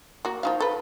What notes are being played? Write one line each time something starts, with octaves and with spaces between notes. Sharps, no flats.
A#3 F#4
F3 D#4 F5
A4 B4